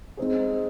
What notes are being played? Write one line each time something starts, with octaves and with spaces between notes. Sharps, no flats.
G#3 C4 D#4 G#4